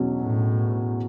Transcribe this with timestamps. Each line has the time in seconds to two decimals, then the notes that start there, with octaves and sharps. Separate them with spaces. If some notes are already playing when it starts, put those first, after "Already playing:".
Already playing: E2 B2 F#3 C#4
0.22 A2